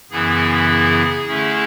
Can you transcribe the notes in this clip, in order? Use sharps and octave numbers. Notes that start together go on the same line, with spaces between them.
F#2 C#3 E3 B3 E4 G#4
G#4
D3 A3 C#4 E4